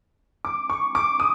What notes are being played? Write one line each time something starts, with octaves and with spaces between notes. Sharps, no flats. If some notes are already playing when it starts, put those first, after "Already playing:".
D6
C#6
D6
D#6